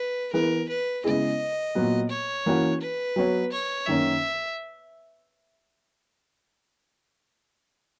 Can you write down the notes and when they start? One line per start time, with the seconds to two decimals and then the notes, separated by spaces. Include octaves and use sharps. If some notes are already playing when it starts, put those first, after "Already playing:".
Already playing: B4
0.33 E3 B3 E4 G#4 A#4 B4
0.69 B4
1.04 C#3 G#3 B3 E4 G#4 D#5
1.75 A#2 F#3 B3
2.10 C#5
2.46 E3 A#3 C#4 F#4
2.81 B4
3.16 F#3 B3 F#4 C#5
3.52 C#5
3.86 F#2 D#3 A#3 C#4 E5